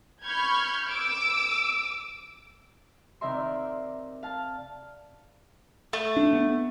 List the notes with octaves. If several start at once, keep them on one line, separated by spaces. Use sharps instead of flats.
B5 C#6 F6 G6 G#6
D6 E6 D7
C3 D#3 A#4 E5 C6
D5
F5 A5
A3
D4
B3